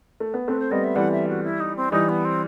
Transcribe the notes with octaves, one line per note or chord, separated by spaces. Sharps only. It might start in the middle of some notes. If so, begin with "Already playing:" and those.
A3
B3
A3 C4 B4
C5
G3 B3 D#5
E5
E3 G3 F#5
E5
F#4
E4
D#4
C4
E3 G3 D#4
B3
C4